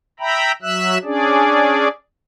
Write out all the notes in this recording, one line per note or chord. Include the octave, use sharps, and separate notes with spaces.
E5 G5 A#5 B5
F#3 E5 E6 F#6
C#4 D4 G#4 D5